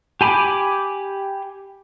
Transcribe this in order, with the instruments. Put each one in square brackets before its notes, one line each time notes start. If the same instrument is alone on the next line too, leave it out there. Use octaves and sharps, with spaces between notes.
[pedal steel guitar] G4 G#5 B5 D6